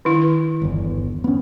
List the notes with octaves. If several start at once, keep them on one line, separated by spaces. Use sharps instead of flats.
D#3 E4
G1 E2
B3 C#4